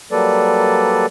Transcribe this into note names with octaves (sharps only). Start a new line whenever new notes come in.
F#3 G3 A#3 A4 B4 D5